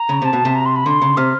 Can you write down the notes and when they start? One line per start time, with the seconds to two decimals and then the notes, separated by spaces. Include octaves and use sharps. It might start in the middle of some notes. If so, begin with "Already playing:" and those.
Already playing: A#5
0.09 C#3
0.22 C3 A5
0.33 B2
0.45 C3
0.55 A#5
0.65 C6
0.75 B5
0.86 D3 C6
1.02 C#3
1.17 C3 F6